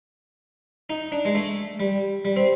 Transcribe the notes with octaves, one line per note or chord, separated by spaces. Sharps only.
D#4
D4
G#3
A3
G3
G3
C4